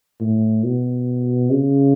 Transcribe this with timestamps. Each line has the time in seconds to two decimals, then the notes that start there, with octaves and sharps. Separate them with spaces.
0.20 A2
0.64 B2
1.51 C#3